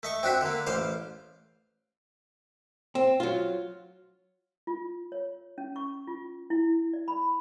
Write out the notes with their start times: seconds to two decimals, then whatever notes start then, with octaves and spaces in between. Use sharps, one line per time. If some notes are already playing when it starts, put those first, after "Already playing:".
0.03 A3 D#5 C#6
0.23 C4 D4 F#4 E5
0.41 D3 A#3
0.67 A1 C5 F5 D6
2.95 C4
3.20 F#3 F4
4.67 F4
5.12 C#5
5.58 C#4
5.76 C#6
6.07 F4
6.50 E4
6.93 D5
7.08 B5